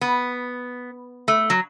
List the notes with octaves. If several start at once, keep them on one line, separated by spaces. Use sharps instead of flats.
B3
A3
F#3